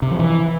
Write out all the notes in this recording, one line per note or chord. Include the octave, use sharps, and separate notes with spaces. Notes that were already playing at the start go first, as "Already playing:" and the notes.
C3
F3
E3